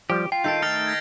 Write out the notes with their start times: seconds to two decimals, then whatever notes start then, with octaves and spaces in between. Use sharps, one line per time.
0.10 F3 G3 G4
0.32 F4 G5 C7
0.44 D#3 A4 G6 D7
0.62 A3 D#4 F6 A6 F7
0.87 G#6 A#6 B6